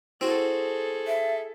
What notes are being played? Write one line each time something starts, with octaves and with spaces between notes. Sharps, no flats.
C4 E4 F#4 G#4 A4
E5